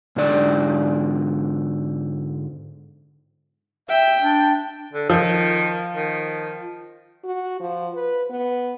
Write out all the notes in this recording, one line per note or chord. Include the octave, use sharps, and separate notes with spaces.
G#2 D3 D5
E5 G5
D4
D3
D#3 F3
D#3
F#4
F3
B4
B3